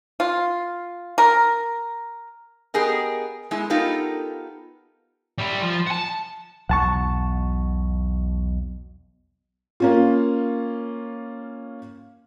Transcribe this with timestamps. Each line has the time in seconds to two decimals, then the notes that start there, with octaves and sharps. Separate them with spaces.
0.20 F4
1.18 A#4
2.74 B3 G4 G#4 A#4 D#5
3.51 G#3 B3 E4
3.70 B3 D#4 F4 G4 A4 A#4
5.38 G3 E4
5.62 F3
5.87 F#5 A5
6.69 B1 E2 B2 F#5 A5 C#6
9.80 A#3 C#4 F4